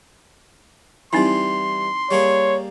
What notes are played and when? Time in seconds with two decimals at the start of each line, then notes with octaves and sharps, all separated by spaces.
1.13 E3 G3 C4 D#4 E4 C6
2.11 G3 A#3 G#4 C#5